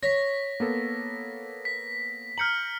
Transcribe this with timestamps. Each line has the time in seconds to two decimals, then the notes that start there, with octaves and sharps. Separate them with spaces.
0.03 C#5 A#6 B6
0.60 A#3 B3 A4
1.65 B6
2.38 A#5 F6 G6 C#7 F#7